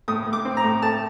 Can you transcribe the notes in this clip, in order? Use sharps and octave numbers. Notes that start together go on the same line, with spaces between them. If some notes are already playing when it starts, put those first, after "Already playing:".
A2 D#6
A2
D6
C4
A#5
A2
A3 A5